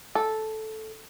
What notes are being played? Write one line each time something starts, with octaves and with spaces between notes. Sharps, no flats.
A4